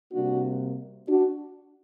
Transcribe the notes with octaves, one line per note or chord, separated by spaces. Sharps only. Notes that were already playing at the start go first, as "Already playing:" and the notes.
C3 G3 A#3 D4 F#4
D4 F#4